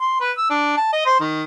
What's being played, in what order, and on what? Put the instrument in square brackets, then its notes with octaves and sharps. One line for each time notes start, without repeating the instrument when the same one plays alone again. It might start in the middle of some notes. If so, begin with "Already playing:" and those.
[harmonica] C6
B4
E6
D4
A5
D#5
C5
D#3